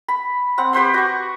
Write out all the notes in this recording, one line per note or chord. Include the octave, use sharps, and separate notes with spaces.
B5
C4 F#5
G4 B4 C5 C6
F#4 C#6